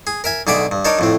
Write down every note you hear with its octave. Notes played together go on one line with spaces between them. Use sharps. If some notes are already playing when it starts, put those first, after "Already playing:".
G#4
A#4 E5 G#5
B1 D3 G#4 D5 E5 D6
G2
D4 D#4 A#4 C#5 A5
F2 A2 C4